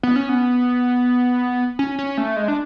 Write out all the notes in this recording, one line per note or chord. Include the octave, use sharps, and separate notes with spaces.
B3
C#4
B3
C#4
C#4
A3
G#3
D4